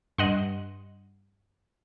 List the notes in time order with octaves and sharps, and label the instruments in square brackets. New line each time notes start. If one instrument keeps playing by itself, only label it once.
[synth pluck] G2 [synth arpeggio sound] D#5 F#5 C6